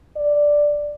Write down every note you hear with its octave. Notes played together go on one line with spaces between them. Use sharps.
D5